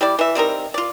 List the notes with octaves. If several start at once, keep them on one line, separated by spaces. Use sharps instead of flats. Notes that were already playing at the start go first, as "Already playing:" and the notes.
G3 E4 D5
E3 E5
G3 C4 D#4 A#4
F4 D5